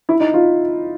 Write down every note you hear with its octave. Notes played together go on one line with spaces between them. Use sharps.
E4
D#4
F4